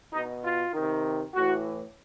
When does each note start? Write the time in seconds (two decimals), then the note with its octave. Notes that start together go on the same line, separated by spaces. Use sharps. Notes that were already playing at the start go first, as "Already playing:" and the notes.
0.12 B2 D#4
0.42 F4
0.73 C3 D#3
1.34 A2 E3 F#4